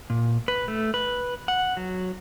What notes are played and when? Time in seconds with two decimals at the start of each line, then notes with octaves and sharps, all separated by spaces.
0.10 A#2
0.48 B4
0.68 A3
0.94 B4
1.48 F#5
1.77 F#3